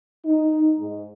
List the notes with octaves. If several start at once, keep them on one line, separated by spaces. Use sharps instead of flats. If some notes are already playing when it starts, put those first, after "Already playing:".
D#4
G#2